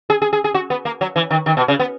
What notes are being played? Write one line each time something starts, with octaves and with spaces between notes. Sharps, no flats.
G#4
G#4
G#4
G#4
F#4
B3
A#3
F#3
E3
D#3
D#3
B2
C#3
B3